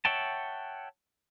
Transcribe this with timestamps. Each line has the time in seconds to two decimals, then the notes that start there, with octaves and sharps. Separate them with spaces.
0.05 C#5 E5 F#5 G5 A5